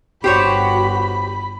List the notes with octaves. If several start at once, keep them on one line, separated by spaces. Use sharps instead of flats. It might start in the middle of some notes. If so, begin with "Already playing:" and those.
G1 F#4 G4 C5 C#5 B5